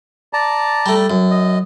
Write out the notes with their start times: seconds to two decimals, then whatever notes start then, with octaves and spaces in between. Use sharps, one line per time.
0.33 D5 A5 A#5
0.86 G3 A3
1.10 F#2
1.31 D#5